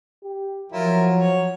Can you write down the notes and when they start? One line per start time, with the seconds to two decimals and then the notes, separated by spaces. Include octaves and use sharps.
0.23 G4
0.72 F3 F#3 E4 F4 A#4
1.16 C#5